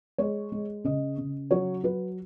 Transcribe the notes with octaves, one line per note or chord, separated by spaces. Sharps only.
G#3 C#5
G#3
C#3 D#5
C#3
F#3 C#5
F#3 B4